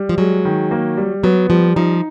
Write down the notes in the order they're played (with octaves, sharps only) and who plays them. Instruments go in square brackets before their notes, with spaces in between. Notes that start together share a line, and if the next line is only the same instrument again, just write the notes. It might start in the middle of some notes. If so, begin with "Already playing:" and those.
Already playing: [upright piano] G3
[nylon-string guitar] F3
[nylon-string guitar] F#3 [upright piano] G#3
[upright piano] D#3
A#3
G3
[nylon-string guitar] F#3 [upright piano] B3
[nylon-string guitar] F3 [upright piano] G3
[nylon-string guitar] F3 [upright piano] D#4